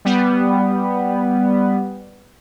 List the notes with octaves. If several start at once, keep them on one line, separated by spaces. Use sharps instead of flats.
G3 B3